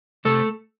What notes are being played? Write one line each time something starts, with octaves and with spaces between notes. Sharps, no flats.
C3 A3 A4